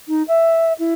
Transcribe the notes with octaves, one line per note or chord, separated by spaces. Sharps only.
D#4
E5
E4